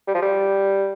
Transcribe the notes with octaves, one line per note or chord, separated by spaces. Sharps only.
G3
F3
G3